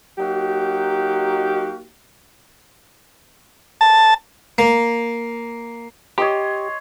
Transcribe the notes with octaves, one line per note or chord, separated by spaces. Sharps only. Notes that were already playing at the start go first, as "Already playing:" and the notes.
F#3 A#3 D#4 F#4 G4
A5
A#3
G4 C#5 D#5 C6